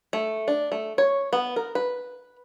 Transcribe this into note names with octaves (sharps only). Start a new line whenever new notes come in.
A3
D4
A3
C#5
B3
A#4
B4